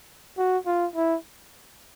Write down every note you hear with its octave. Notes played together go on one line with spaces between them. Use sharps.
F#4
F4
E4